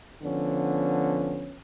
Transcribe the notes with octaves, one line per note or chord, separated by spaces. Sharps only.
D3 F3 B3 C#4